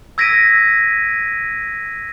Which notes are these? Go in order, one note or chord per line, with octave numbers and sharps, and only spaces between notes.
E6 G#6 A#6 B6 D7 D#7